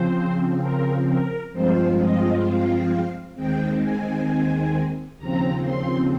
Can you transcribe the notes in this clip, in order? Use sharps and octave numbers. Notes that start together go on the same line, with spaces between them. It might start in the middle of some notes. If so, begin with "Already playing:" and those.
Already playing: C#3 F3 C4 C5
A#4
A#4
G2 F3 G#3 C4 F4 C5
D#5
F5
D#2 D#3 G#3 C4 G5
G#5
D#2 C#3 F3 C4 A#5
C6